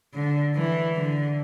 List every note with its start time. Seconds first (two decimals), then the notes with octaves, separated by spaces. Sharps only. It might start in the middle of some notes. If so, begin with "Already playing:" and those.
0.13 D3
0.54 E3
0.94 D3